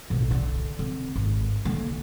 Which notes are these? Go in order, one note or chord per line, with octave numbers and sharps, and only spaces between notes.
B1 A2
D3
D3 C4
G#1
D3 A#3